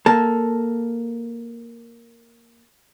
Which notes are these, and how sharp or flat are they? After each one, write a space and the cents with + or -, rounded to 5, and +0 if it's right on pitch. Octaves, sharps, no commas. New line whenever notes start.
A#3 +0 A4 +0 A5 +0